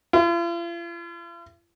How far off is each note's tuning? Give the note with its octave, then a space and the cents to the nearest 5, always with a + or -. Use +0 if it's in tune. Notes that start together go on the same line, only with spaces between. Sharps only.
F4 -45